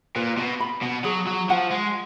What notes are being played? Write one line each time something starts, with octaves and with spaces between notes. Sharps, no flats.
A#2 B4
B2
B5
B2
F#3 G#4
F#3
F3 F#5
G#3